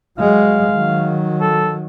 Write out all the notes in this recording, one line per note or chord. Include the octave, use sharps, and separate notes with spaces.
F#3 G#3 F5
D#3 F#3
A4